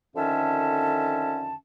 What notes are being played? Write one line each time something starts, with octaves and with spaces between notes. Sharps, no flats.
F2 D3 D#3 C#4 E5 A5